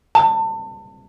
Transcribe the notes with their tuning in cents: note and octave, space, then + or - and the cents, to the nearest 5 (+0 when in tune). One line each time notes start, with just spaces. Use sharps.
A5 +30